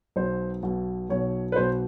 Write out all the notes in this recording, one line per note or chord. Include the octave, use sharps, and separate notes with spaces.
B1 B2 C5
B1 B2
B1 B2 C#5
B4
B1 B2 C5